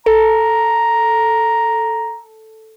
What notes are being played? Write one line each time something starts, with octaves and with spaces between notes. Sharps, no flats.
A4 A#5